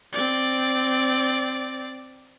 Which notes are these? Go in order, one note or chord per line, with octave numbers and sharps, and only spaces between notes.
C4 D5